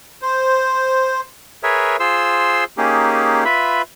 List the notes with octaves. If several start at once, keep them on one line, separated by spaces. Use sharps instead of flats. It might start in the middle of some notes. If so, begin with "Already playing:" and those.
C5
G#4 A#4 B4 C#5 E5
F4 G#4 C5 C6 E6
A#3 C#4 D#4 G4 G#4
F4 B4 E5 B5